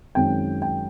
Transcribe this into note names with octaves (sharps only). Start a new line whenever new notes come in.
F#2 D#3 G#3 C4 G5
G5